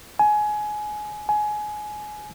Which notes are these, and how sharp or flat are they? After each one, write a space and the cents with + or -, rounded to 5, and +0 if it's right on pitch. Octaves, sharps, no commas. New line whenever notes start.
G#5 +20
G#5 +20